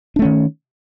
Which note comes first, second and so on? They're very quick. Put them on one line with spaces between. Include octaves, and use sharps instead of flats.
D4 A3 C#4 D#3